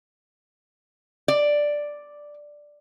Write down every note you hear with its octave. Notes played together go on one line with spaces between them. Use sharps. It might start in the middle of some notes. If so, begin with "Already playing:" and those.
D5